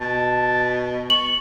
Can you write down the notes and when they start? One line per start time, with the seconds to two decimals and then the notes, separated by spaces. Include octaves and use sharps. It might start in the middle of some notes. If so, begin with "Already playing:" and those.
0.01 B2 A5
1.10 C#6 F#7